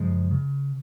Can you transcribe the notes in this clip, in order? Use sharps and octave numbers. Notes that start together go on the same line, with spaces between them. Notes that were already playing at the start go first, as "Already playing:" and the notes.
Already playing: F#2 C#3 F3 G#3
C#3